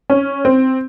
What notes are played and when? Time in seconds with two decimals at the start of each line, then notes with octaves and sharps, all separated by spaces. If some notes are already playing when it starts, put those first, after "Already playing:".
0.10 C#4
0.45 C4